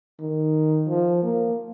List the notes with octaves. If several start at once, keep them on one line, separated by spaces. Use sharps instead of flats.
D#3
F3
A#3